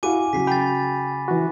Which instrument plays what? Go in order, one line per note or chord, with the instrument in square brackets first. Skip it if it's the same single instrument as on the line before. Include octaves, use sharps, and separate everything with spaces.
[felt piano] E4 F#4 F5 [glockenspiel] G#5 D6 D#7
[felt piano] C#3 F#3 [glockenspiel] B6 C7
[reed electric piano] G5 [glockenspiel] B5 A6
[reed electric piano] E3 F#4